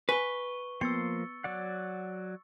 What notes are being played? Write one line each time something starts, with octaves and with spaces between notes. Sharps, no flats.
B4 G#5 C#6 G7
F3 A#3 B3 C6 E6 A6 C#7
F#3 D5 F#5